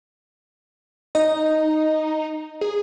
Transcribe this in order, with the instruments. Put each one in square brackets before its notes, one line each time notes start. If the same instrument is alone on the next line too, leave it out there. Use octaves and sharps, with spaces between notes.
[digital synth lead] D#4 [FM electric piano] D#5
[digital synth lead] G#4